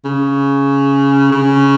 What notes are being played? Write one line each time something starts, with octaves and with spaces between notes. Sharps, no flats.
C#3
C#3